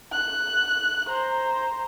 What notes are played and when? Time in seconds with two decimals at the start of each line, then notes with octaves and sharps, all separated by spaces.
0.12 F#6
1.08 C5 A#5